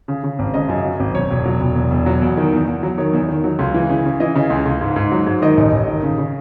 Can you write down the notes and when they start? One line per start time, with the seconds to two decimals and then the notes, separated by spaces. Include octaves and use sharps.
0.08 C#3
0.23 C#3
0.39 G#1
0.54 C#3 D#5
0.69 F#2
0.85 F#3
1.00 G#1
1.15 E1 C#5
1.30 E1
1.46 F#3
1.61 E1
1.76 E2
1.91 E1
2.06 F#3
2.22 E2
2.37 D#3
2.52 E2
2.67 E2
2.83 F#3
2.98 D#3 C#5
3.13 E2
3.29 D#3
3.44 F#3
3.59 C#2
3.74 E3
3.89 C#3
4.05 C#3
4.20 E3 D#5
4.35 C#3
4.50 C#2
4.66 C#2
4.81 G#2
4.96 G#2
5.12 F#3
5.27 G#2
5.42 D#3 D#5
5.57 A1
5.73 A1
5.88 D#3
6.03 C#3
6.18 C#3